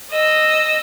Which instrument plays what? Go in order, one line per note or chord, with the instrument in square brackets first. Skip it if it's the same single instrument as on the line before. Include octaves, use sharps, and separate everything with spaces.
[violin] D#5 E6